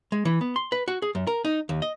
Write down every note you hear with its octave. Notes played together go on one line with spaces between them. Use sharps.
G#3
E3
B3
C6
B4
F#4
G#4
F#2
A#4
D#4
D#2
D#5